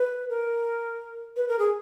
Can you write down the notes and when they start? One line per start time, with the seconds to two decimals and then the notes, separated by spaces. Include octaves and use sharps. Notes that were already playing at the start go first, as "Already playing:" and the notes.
Already playing: B4
0.30 A#4
1.37 B4
1.48 A#4
1.59 G#4